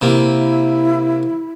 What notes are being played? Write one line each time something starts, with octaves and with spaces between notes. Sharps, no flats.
C3 A#3 E4